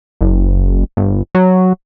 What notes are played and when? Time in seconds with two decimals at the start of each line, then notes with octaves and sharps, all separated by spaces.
0.21 F#1
0.97 G1
1.35 F#3